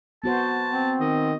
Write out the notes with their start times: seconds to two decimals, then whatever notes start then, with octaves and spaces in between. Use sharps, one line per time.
0.24 B3 F#4 C5 A5
0.70 C4
1.00 D#3 D#5